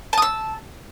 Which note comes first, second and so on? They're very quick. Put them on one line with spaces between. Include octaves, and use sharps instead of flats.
A5 D#6 E6